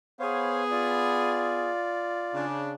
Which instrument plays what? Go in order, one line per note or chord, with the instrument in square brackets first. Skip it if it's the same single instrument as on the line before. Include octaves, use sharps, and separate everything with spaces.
[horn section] B3 G#4 [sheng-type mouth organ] C5 C#5 F5
[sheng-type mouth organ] F4 D5
[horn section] C#3 D4